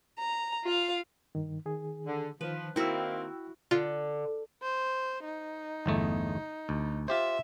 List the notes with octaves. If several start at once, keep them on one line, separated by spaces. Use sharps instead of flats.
A#5
F4 F5
G2 D#3
D#3 G#4
D3
D#3 F3 B4
D#3 A#3 C4 E4 F#4 G5 E6
D3 F4
C5
D#4
G1 E2 A3
D2
F4 G4 C5 E5